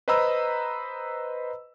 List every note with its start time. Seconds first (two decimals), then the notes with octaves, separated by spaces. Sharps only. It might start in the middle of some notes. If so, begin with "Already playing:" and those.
0.08 B4 C5 D#5 A#5 B5 E6